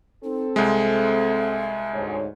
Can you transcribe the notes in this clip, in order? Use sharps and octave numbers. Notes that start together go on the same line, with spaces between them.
C4 D#4 A4
C2 G#3 E5
D2 G#2 C#5